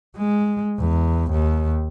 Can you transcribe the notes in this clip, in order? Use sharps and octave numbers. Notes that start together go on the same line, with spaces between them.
G#3
E2
D#2